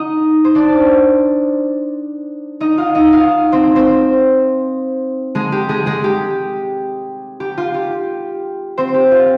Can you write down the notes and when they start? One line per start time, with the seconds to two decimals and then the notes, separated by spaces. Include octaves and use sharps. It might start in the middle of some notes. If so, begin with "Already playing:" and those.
Already playing: D#4 D#5
0.45 C5
0.55 D4 D5
2.60 D#4 D#5
2.77 F4 F5
2.95 D#4 D#5
3.12 F4 F5
3.52 C4 C5
3.75 C4 C5
5.35 G#3 G#4
5.52 G4
5.69 G#3 G#4
5.86 G#3 G#4
6.04 G4
7.40 G4
7.57 F4
7.74 G4
8.78 C4 C5
8.94 G4
9.11 F4